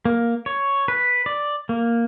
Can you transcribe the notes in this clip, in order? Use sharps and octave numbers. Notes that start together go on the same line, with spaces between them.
A#3
C#5
B4
D5
A#3